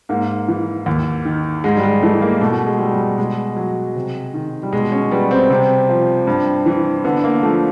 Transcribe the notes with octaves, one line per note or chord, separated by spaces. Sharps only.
G#2 A#3
E3
D#2
D#3
G#2 G#3
G3
G#3
E3 A3
A#3
B2 A3
G#3
G3
G3
B2 G#3
F#3
C3
D#3
G3
B2 G#3
C#4
G3 B3
C4
C3 C4
F3
G2
E3
D3 B3
A#3
F3 A3